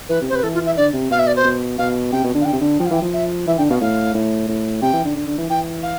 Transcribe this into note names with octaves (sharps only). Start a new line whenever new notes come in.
E3 B4
C3
C5
C3 B4
E3 A4
F4
E5
D3 D5
C3
B2 F5
E5
D5
C5
B2
B2 F5
C3 G5
B2
D3
F5
D3 G5
C3
D3
F3 G5
F5
E3 G5
F3
E5
E3 E5
D3 G5
B2 F5
A2 F5
A2
A2
C3 G5
E3
D3
D3
D3
E3
E3 G5
F5